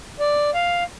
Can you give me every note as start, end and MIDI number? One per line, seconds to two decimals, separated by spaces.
0.20 0.50 74
0.55 0.84 77